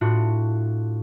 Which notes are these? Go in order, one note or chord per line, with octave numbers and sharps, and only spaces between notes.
A2 D4 F4 F#4